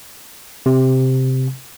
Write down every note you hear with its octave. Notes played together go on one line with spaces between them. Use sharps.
C3